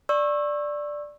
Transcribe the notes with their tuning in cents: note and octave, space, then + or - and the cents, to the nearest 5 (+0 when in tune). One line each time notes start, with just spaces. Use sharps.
D5 +0 C#6 -25 E6 +0